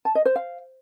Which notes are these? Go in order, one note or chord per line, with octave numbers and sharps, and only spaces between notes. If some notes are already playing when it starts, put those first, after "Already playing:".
A5
D#5
C5
F5